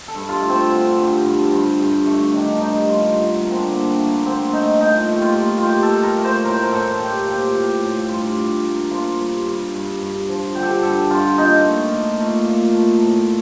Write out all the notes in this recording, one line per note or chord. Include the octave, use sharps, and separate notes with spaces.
A4
G2
F4
A3
C4
D3
G2
G2
G2
G2
A3
D#3 D4
G2 D#4
G2 F4
D3
A3 A#3
C4
D4
D3
A3 A#3
D3 C4
A3 D#4
A#2 D#4
A3
G4
F4
A#2
A3 F4 G4
A4
A#2
A#4
A3
C5
A2 A#4
C5
A#4
A2 A4
A#3 G4
F3 G4
A2
A2
G2 F4
G2
A#3
F3 F4
G2
G2
G2
G2
F3
D3 G4
A4
G4
G2 A4
G2 F4
A#2 D#4
A3
A#2
A3
A#2
A3
A2